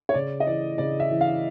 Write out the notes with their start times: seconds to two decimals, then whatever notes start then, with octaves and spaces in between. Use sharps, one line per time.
0.09 C#5
0.14 C#3 D5
0.40 D#5
0.47 E3 D5
0.78 C#3 D5
1.00 E5
1.10 E3
1.21 F5